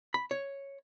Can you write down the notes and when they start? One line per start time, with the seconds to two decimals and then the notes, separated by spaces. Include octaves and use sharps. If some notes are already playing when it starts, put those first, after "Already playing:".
0.14 B5
0.31 C#5